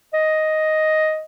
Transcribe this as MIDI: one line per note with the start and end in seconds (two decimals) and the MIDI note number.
0.13 1.23 75